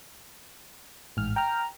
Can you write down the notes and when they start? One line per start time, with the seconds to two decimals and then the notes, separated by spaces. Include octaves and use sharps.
1.17 A1 G#2 F6
1.36 G5 A#5 F6